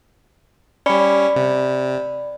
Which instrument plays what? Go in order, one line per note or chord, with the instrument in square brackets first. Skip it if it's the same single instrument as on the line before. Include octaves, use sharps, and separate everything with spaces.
[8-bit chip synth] G3 C#4 [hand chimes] D5 B5 C#7
[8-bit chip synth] C3